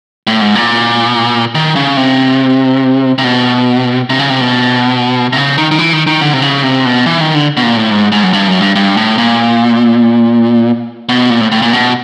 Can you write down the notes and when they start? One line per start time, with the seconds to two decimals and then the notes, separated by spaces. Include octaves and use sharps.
0.27 A2
0.41 G#2
0.55 A#2
1.55 D#3
1.76 C#3
1.97 C3
3.18 C3
3.24 B2
4.10 C3
4.19 C#3
4.30 C3
4.41 B2
5.33 C3
5.36 C#3
5.58 D#3
5.71 D#3
5.78 E3
5.93 D#3
6.07 D#3
6.21 D3
6.34 C3
6.42 C#3
6.63 C3
6.85 B2
7.06 E3
7.20 D#3
7.35 D3
7.57 B2
7.63 A#2
7.77 A2
7.91 G#2
8.12 G#2
8.23 F#2
8.33 G2
8.48 F#2
8.62 G2
8.76 G2
8.97 A2
9.18 A#2
11.09 B2
11.30 A#2
11.41 A2
11.52 A2
11.62 A#2
11.73 B2